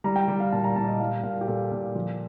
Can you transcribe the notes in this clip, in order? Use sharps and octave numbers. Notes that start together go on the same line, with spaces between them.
G3 A#5
G5
G3
F5
A#2 A5
A#5
A#2 A5
D#5
G3 F5
A#2 F5
G4
A#2 A4
A#2
F3